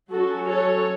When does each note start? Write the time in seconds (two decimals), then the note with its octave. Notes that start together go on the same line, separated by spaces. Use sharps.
0.10 F#3 C#4 F#4 A4
0.48 A4 C#5